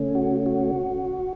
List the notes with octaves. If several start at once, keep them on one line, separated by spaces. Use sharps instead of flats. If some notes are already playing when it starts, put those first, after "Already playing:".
Already playing: C#3 A3 C#4
F#4
F#4